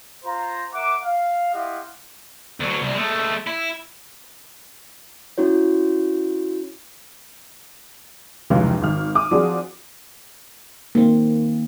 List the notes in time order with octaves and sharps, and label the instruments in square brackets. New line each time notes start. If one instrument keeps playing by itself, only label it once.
[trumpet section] F4 C5 A#5
A#4 E5 F#5 D6
F5
E4 F4 G4 D#5 F5 F#5
[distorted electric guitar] D2 F#3
C2
G#3 A3
E4
[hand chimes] C#4 E4 F#4 C#5
[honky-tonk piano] F1 C#2 E3 F#3 C#4 F5
G#1 F6
D6 D#6
F3 C4 D4 F#4 G#4
[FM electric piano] D#3 C4 [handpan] A#3